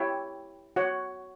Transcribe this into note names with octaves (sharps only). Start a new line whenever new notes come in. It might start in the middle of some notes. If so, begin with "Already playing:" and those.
Already playing: E4 G4 C#5 E5 G5
F#4 C#5 F#5